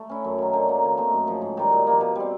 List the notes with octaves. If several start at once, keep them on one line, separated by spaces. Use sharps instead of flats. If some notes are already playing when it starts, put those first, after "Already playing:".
Already playing: A3
C#4 E4
F#2
D#3 F#3
D3
F#3 A#3
E3
A3 C4 D#4
F#2
C#3 F3
G#2
D#3 G3
A#2
F3 A#3
B2
G3 C4